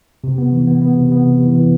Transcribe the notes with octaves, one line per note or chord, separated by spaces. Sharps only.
C3
B3
E3
B3
B3
C3
B3
C3
E3
E3